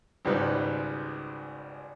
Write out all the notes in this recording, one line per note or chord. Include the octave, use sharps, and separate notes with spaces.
G#1 C#2 G3 D#4 B4